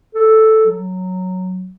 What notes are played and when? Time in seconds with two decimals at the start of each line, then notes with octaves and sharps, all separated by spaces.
0.15 A4
0.67 F#3